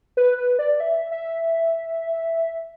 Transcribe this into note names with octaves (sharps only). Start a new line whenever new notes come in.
B4
B4
D5
E5
E5